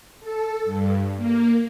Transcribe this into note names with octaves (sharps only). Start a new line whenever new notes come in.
A4
G2
A#3